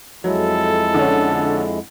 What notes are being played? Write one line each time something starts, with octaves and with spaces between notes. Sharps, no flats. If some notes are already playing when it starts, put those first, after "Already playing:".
F2 F#3 G#3 E4 A4
D3 F3 C#4